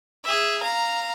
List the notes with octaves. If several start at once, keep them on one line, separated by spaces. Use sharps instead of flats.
G#4 E5
F5 A#5